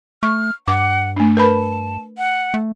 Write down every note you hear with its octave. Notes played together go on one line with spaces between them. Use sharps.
A3 C#6 F6
G2 F#5 D6
A3 D4
A#4 B4 A5 B5
F#5
A3